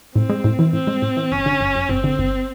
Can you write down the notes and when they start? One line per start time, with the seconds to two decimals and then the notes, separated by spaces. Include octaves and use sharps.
0.15 A2 C4
0.30 G#3
0.44 A2
0.59 E3
0.73 A2 C4
0.87 G#3
1.02 A2
1.17 E3
1.31 G1 C#4
1.46 D3
1.61 G1
1.75 F#2
1.89 G1 C4
2.04 D3
2.19 G1